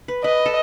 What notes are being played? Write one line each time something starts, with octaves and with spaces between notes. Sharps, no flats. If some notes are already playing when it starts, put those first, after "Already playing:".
B4
B4 D#5
A4